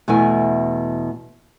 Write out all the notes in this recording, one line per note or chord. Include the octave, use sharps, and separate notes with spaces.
E2 B2 A3 E4 G#5